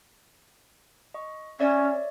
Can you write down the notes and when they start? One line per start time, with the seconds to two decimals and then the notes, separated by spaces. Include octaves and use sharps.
1.14 D#5 C#6
1.60 C#4 C#5 D5 E5